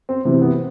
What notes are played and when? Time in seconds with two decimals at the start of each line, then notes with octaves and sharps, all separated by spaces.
0.09 C4
0.25 C3 E3 C4
0.41 B3